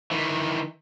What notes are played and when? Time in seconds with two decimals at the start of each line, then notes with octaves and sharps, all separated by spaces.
0.11 D#3 E3